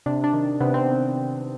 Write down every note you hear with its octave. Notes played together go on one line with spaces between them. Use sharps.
C3 D4
D4
D#3
C3 B3
C4